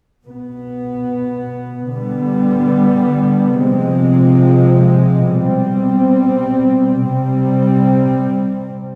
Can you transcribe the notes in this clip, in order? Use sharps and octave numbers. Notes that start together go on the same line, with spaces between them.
B2 B3
D3 G3 B3
C3 F3 G#3 C4
B2 G3 C4
C3 G3 C4